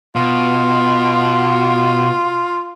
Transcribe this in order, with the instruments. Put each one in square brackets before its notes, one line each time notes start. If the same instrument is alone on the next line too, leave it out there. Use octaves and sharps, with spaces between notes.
[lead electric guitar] B2 [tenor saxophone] F4